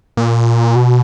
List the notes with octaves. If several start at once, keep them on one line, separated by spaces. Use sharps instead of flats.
A#2
B2